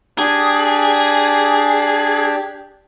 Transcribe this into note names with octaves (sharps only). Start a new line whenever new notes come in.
D4 G4 G#4